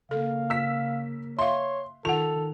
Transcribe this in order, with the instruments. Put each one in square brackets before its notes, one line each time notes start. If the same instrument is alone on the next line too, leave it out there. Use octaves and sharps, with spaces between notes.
[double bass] C#3 A#3 [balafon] A4 [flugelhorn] F5
[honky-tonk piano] E6 B6
[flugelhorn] C#5 [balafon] E5 F5 [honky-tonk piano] C6
[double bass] D#3 [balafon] F4 F#5 [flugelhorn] A4 [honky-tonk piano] F7